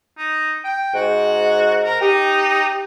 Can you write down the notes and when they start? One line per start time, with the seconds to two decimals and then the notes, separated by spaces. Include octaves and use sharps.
0.18 D#4
0.64 G5
0.94 G#2 F#4
1.83 A#4
2.01 D#4 G4